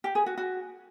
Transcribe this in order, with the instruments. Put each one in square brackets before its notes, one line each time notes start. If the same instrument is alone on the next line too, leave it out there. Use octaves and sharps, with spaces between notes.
[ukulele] G4
G#4
F#4
F#4